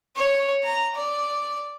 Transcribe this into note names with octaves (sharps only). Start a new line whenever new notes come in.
C#5
A#5
D5